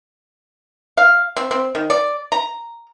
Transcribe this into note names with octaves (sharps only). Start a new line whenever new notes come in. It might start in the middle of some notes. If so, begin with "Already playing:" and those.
F5
C4
C4
D#3
D5
A#5